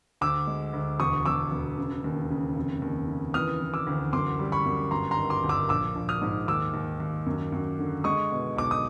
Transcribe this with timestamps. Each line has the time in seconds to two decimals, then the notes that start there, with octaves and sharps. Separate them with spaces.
0.21 D2 D6 E6
0.47 G#3
0.73 D2
1.00 E1 C#6 D#6
1.25 E1 D6 E6
1.51 E1
1.78 C#3
2.04 D#2
2.30 C#3
2.56 F1
2.82 D#2
3.08 C#3
3.34 E3 D#6 F6
3.61 E3
3.74 D6 E6
3.87 D2
4.13 F#2 C6 D6
4.39 G3
4.52 B5 C#6
4.65 F#2
4.91 G1 A#5 C6
5.11 A#5 C6
5.17 D#3
5.30 C6 D6
5.43 G1
5.49 D6 E6
5.69 A#1 D6 E6
5.95 A#1
6.09 D#6 F6
6.21 G#2
6.48 D#2 D6 E6
6.74 D#2
7.00 D#2
7.27 F#2
7.52 F#2
7.79 D3
8.04 G#3 C#6 D#6
8.31 B2
8.56 B1 D6
8.71 D#6